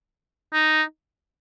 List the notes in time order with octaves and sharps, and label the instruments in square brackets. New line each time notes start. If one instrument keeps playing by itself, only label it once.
[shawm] D#4